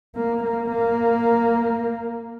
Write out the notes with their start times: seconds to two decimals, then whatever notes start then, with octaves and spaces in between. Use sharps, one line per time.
0.16 A#3
0.44 A#3
0.72 A#3